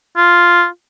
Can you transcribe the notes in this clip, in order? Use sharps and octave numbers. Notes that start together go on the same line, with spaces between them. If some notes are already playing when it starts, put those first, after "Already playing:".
F4